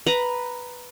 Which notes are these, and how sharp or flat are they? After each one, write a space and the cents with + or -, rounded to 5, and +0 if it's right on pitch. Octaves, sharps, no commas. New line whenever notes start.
B4 +0 A#5 +0